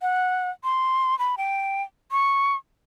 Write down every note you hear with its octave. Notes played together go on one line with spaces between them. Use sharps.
F#5
C6
B5
G5
C#6